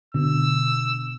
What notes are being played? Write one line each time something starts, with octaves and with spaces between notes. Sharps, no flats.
B2 D3 E6